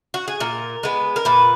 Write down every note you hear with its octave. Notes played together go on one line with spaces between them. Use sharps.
F#4
G#4
A#2 A#4
G#3 B3
A#4
A#2 B4